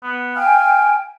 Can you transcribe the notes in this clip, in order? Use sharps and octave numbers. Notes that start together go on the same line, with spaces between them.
B3
F5 G5 G#5